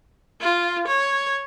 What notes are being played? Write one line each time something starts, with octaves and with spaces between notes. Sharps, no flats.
F4
C#5